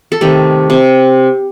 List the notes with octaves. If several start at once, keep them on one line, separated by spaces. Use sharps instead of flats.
A4
C3 D#3 A3 G4
C3